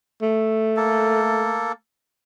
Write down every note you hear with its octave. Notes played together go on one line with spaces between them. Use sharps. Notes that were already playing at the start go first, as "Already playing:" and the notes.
A3
A#3 A4